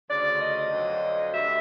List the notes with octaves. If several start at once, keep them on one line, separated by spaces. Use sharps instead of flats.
D2 C#3 F3 D5
D#5
F2 D3 F#3
D2 D3 G3 E5